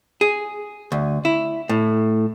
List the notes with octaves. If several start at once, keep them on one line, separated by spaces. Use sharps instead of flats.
G#4
D2
E4
A2